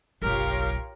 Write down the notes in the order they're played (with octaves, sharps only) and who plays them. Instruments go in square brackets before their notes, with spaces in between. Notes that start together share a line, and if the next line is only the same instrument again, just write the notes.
[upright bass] F#1 B1 [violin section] F4 G4 C#5 [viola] A#4